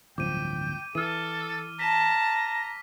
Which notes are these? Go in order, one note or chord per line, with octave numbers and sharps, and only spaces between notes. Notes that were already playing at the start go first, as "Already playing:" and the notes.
D1 G1 F3 G5 D6 D#7
E3 A4 F6 D#7
A5 A#5 B6